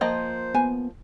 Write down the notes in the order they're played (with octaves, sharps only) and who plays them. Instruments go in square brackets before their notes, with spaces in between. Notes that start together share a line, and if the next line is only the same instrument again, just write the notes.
[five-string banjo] F3 A#3 D#5 [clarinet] C5 [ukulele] G5
[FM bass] B3 [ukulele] G#5